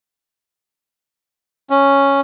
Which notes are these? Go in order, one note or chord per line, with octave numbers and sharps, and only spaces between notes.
C#4